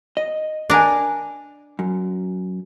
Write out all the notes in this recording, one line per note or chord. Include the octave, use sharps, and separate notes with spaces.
D#5
D4 A#4 D5 G#5
F#2